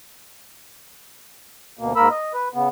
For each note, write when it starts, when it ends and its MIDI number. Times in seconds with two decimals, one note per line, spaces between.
1.79 1.93 38
1.79 1.93 47
1.79 1.93 58
1.96 2.08 44
1.96 2.08 58
1.96 2.08 70
1.96 2.08 83
1.96 2.08 88
2.11 2.33 75
2.34 2.49 71
2.54 2.69 49
2.54 2.69 59